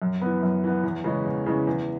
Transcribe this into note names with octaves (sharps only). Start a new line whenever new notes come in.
F#2
E3 B3
F#2
E3 B3
E2
C#3 E3 G#3 C#4
E2
C#3 E3 G#3 C#4
E2